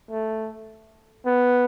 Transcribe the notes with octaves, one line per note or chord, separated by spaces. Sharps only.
A3
B3